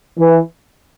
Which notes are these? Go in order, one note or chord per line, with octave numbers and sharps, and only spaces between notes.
E3